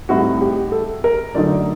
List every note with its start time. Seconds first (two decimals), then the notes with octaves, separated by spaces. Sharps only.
0.09 A2 G3 C4 D#4 F#4
0.41 G4
0.72 A4
1.04 A#4
1.34 F#2 D3 F#3 A3 D#4 D5